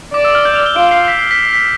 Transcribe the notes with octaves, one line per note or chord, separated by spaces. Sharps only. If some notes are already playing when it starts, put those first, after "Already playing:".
D5 D6
E6
F6
G6
F7
G7
F4 D7
C7
B6
C7
B6
C7
B6